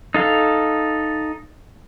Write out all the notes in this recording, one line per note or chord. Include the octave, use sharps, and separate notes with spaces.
D#4 A4 F5